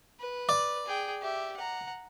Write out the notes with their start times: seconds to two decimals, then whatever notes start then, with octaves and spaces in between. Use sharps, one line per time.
0.20 B4
0.49 D5
0.86 G#4 G5
1.21 G4 E5
1.56 F#5 A#5